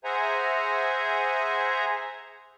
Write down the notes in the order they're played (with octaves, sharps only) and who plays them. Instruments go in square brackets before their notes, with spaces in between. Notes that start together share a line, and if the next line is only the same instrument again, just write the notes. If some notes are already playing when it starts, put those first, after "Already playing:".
[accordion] G#4 C5 E5 F#5 G#5 A#5